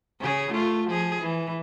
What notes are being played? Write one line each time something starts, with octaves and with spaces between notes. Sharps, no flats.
C#3 G#4
A3 F4
F3 G#4
E3